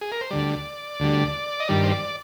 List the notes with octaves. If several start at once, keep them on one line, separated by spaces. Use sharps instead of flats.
G#4
A#4
C5
D2 D3 G3 D5
D2 D3 G3
D#5
G2 D#3 G3 D5
C5
D5